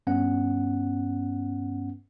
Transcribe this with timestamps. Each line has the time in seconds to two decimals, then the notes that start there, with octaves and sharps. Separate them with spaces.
0.07 G2 B3 C#4 F#5